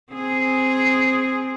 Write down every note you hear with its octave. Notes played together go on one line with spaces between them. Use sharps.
C4 G#4